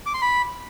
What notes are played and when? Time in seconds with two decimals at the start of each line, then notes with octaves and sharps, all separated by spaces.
0.06 D6
0.14 C6
0.22 B5